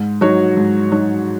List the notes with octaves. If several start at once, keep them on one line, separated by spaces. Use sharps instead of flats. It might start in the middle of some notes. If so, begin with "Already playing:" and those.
Already playing: G#2
F#3 D#4 F#4 C#5
G#2
F#3 D#4 F#4 C#5